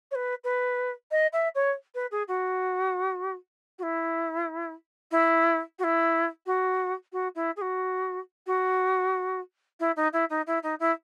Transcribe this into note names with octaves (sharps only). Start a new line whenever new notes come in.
C#5
B4
B4
D#5
E5
C#5
B4
G#4
F#4
F#4
E4
E4
F#4
E4
F#4
F#4
E4
G#4
F#4
F#4
E4
D#4
E4
D#4
E4
D#4
E4